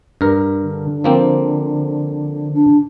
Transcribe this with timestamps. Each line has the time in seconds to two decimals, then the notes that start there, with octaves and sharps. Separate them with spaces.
0.21 G2 A#4
0.62 D3
1.04 F3 A#3 C4
2.53 D4